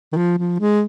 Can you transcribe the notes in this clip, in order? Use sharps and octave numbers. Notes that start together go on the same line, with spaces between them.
D#3
F3
F3
G#3